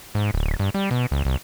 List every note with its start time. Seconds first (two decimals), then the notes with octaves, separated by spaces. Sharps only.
0.15 G#2
0.34 D1
0.59 G2
0.74 G3
0.91 B2
1.11 C#2
1.25 C2